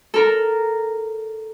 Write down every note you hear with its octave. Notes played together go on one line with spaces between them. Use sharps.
A4 A#4